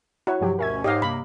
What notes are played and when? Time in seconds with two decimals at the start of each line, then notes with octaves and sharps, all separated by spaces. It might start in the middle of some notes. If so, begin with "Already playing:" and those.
0.27 E4 F#4 C#5
0.41 G2 C3 F3 F#3 G4
0.59 D2 B2 C#4 A#4 E5 G#6
0.84 G#2 G4 C#5 D#5 F5
1.02 G2 C3 A#3 B5